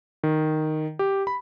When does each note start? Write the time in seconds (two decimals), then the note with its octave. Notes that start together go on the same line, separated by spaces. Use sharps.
0.23 D#3
0.99 G4
1.27 B5